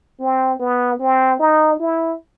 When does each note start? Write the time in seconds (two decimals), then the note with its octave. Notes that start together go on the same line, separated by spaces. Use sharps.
0.20 C4
0.60 B3
1.00 C4
1.40 D#4
1.79 E4